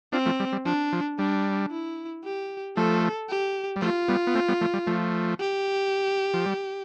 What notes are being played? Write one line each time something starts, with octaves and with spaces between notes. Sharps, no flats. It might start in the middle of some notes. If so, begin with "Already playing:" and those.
C4 D4 F4
F3 A3
G3
G3
F3 D4
F3
G3 D4
E4
G4
F3 A3 A4
G4
G3
F3 A3 F4
G3 B3
B3
A3 C4
G3 B3
F3 A3
G3
F3 A3
G4
F3
G3